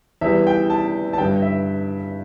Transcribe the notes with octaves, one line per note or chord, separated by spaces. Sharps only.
E2 E3 G3 E5
G5
A5
A5
G2 D3 G3 G5
E5